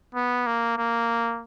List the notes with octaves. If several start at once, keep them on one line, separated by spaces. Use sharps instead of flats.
B3
A#3
A#3